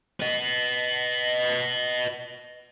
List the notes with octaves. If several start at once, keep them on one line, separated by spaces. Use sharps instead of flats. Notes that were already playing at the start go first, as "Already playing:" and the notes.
B4 D#5